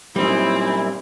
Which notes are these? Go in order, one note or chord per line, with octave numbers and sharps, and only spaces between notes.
F#2 A#2 G3 C4 D#4 E4